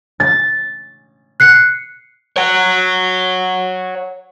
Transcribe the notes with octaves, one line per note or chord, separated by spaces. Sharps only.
A6
F#6 C7 C#7
C#5 F#5